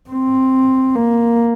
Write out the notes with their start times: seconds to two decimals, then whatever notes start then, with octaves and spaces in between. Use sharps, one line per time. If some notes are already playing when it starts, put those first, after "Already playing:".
0.10 C4
0.96 A#3